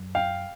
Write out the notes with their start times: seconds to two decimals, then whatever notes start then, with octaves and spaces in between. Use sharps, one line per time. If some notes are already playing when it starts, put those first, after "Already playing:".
Already playing: F#2
0.15 F5 G5